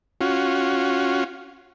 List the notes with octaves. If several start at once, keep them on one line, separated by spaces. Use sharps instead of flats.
C#4 F4 F#4